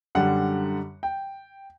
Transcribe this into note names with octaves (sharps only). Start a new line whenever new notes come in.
F#2 D3 G3 F#5
G5